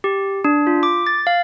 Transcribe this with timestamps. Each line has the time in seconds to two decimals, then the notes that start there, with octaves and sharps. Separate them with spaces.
0.04 G4
0.45 D4
0.67 F4
0.83 D6
1.07 A6
1.27 F5